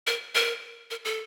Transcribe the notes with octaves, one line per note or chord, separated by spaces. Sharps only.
A#4
A#4
A#4
A4